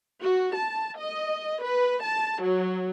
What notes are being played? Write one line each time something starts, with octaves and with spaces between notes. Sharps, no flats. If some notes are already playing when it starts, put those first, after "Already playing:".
F#4
A5
D#5
B4
A5
F#3